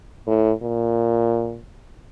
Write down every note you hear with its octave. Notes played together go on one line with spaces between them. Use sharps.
A2
A#2